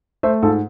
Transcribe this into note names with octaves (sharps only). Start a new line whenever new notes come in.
A3 C5 E5
G#2 F4 A4